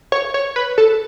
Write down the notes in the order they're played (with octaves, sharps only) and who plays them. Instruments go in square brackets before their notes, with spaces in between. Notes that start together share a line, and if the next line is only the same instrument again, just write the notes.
[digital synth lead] C#5
C#5
B4
A4